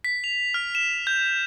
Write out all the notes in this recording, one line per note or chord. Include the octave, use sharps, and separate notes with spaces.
B6
F7
F6
E7
G6